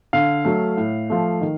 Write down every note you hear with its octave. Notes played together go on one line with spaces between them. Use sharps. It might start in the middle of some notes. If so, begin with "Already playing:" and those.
D3 F5
F#3 A3
A2
F3 A3
D#3